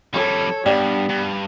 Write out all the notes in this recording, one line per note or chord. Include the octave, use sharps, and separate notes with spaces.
F2 G3 A4 C#5
G2 G3 B3
G2